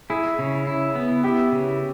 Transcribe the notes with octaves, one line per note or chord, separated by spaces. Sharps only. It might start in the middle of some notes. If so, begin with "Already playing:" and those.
E4 G#4
C#3
E4
B3
E4 G4
C#3